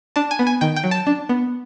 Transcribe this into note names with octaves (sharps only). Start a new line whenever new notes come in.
D4 A5
G#5
B3
G#5
D#3 G5
G5
F#3
A5
D4
B3